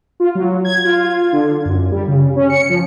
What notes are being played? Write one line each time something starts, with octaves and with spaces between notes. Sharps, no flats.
F4
F#3
G#6
F4
D3
F#2
G3
C#3
C#4
C#7
F3